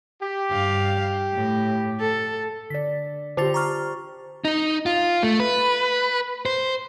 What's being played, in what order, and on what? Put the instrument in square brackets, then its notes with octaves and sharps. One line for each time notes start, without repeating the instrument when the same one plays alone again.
[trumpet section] G4
[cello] G2 F5
A2
A4
[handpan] D3 D5 [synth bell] B6
[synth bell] D3 F4 A6 [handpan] G4 C5
[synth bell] A#5 C#6 F6
[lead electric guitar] D#4
F4
A3
B4
C5